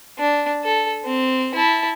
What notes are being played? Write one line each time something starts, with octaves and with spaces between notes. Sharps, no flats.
D4
A4
C4
E4 A5